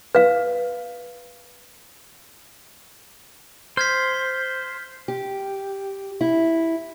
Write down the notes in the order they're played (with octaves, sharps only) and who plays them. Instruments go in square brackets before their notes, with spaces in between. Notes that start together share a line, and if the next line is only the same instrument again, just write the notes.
[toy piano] B4 F5
[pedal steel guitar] C5 [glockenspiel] F6 G#6 B6
[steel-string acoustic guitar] G4
E4